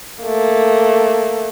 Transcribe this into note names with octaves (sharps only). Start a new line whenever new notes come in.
A3 A#3